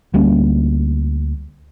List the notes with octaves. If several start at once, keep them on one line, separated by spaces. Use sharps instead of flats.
D2 G3 A#3 C#4